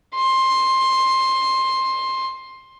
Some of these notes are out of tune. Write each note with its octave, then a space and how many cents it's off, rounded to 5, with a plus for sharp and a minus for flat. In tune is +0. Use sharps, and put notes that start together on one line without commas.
C6 +15